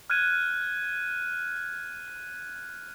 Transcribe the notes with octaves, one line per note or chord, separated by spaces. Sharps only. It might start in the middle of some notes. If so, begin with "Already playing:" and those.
F6 F#6 G#6 D#7